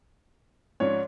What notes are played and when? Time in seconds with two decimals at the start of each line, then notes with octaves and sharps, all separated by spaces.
0.80 G#2 F3 C#4 C#5 D5